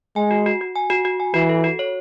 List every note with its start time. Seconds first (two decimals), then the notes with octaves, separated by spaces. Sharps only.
0.16 G#3 G#5
0.31 F#4
0.46 F#4
0.61 F#4
0.75 G#5
0.90 F#4
1.05 F#4
1.20 G#5
1.34 E3 F#4
1.49 A4
1.64 F#4
1.79 C#5